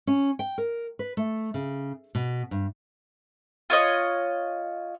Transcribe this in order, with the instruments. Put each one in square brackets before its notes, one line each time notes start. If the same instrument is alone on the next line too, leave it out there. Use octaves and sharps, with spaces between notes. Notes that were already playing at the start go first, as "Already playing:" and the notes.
[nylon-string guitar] C#4
G5
A#4
B4
A3
C#3
B2
G2
[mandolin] F4 C#5 D#5